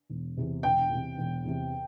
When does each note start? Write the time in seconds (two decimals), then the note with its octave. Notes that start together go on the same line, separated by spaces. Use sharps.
0.10 E1
0.37 E2 C3
0.63 E1 G5
0.90 E2
0.95 C3
1.18 E1
1.44 E2 C3